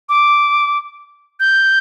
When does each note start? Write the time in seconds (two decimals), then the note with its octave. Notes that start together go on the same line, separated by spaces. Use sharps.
0.09 D6
1.40 G6